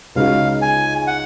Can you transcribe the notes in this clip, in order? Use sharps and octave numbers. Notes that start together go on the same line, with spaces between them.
C#2 C#3 G#3 D#4 F#4 F5
G#5
F#5